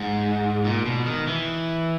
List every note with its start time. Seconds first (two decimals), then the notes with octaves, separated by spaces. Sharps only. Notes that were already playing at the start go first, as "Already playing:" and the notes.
Already playing: G#2
0.64 A#2
0.86 B2
1.06 D#3
1.27 E3